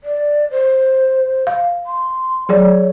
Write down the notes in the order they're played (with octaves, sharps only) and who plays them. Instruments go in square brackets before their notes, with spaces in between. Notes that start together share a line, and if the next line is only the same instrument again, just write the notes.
[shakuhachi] D5
C5
[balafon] F5
[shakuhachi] C6
[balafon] F#3 G#4 D5 [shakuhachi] C#5